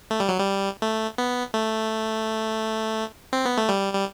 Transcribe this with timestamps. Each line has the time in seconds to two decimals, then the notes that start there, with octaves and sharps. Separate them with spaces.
0.11 A3
0.20 G3
0.28 F#3
0.38 G3
0.82 A3
1.18 B3
1.54 A3
3.33 C4
3.45 B3
3.57 A3
3.69 G3
3.93 G3